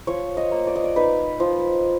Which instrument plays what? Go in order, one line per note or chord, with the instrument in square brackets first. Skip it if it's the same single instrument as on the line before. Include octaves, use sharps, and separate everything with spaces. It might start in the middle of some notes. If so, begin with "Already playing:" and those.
[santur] F3 C#5
D#5
A#3
D5
D#5
D5
D#4 B4
F3